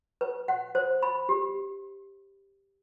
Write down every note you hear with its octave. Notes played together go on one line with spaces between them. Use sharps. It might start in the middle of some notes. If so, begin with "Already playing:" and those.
B4
F#5
C5
B5
G4